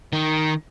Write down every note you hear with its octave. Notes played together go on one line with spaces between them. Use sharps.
D#3